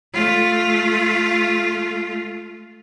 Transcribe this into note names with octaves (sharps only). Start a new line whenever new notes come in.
A3 F4